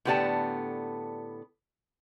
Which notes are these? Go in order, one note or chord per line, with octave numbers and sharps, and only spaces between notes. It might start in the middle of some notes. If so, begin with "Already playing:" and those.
A2 D3 B3 G4 D5 A5